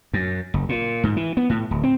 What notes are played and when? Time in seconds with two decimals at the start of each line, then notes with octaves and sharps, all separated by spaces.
0.14 F#2
0.54 F#1
0.69 A#2
1.04 G#2
1.17 E3
1.37 B3
1.50 A2
1.71 D1
1.84 C4